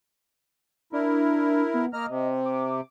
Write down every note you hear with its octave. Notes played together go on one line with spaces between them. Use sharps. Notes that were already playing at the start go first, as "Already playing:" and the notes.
D4 E4 A#4
B3
A#3 D#5 A#5 F6
C3
D6